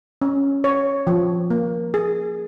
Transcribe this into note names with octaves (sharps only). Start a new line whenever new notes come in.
C#4
C#5
F3
A#3
G#4